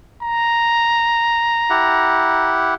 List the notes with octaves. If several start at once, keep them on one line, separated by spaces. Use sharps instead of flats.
A#5
E4 G4 F#5